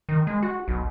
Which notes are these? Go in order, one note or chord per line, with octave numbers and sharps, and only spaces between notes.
D#3
G#3
F#4
B1